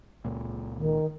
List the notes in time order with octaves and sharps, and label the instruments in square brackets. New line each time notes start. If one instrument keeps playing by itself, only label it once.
[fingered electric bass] C#2 A#2
[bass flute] D#3